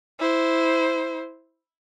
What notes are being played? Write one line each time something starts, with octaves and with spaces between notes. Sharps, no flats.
E4 C5